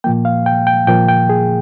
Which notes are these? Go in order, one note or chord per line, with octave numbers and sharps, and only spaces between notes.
A#2 F3 A#3 G5
F5
G5
G5
A#2 F3 A#3 G5
G5
G#4